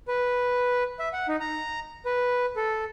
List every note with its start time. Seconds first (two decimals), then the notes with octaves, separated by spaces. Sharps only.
0.08 B4
0.99 E5
1.13 F#5
1.29 D#4
1.40 A#5
2.06 B4
2.56 A4